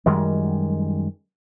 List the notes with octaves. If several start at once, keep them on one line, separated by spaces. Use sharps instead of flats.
F#2 D#3 G3 G#3